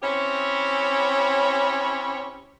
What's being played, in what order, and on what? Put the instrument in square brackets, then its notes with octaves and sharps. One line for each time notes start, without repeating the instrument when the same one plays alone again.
[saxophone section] C4 C#4 E4 G4 C#5